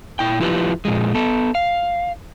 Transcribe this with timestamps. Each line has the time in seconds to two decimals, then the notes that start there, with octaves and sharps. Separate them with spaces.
0.19 A#2 E4 G5
0.40 F3 E4 F4 G4 B4
0.85 A#2 F3 G#3
1.14 B3 A4
1.55 F5